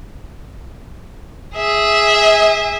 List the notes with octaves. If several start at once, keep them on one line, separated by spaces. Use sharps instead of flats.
G#4 E5